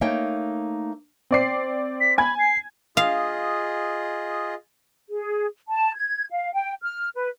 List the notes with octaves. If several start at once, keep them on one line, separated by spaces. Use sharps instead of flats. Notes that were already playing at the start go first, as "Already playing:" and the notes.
A3 A#3 D#4 A#4 C#5 G5
C4 D5 C7
B6
G#5 B5 G#6
C7
F4 G#4 D#5 F5
G#4
A5
G#6
F5
G5
F6
B4